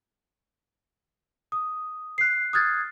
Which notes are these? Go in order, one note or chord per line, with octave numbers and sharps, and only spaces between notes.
D#6
F#6 C7
D#6 F6 F#6 G#6 A6